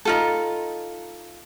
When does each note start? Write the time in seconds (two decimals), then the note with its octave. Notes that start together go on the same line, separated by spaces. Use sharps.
0.05 D#4 F4 A4